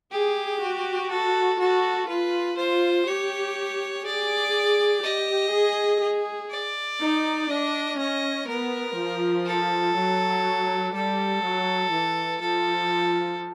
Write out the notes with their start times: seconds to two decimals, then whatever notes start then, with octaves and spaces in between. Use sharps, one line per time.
0.11 G4 G#4
0.61 F#4
1.10 A4
1.59 F#4 A4
2.08 F4 B4
2.57 F4 C5
3.07 G4 C#5
4.05 G#4 D5
5.04 G4 D#5
5.52 G#4
6.01 G#4
6.51 D5
7.01 D#4
7.49 D4 D#5
7.98 C#4 D#5
8.48 B3 A#4
8.97 F3
9.46 A4
9.96 F#3
10.94 G3 A4
11.43 F#3
11.92 E3
12.41 F3 A4